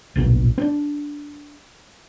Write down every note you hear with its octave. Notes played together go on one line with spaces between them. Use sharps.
D1 A#1 B2 A#3
C4 D4